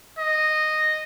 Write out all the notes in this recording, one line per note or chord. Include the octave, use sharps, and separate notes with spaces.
D#5